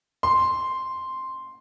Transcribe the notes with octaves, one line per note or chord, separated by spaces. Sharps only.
C6